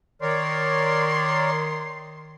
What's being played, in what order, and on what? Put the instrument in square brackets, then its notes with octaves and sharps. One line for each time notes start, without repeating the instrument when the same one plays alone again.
[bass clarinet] D#3 [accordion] A#4 C#5 D5 [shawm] C6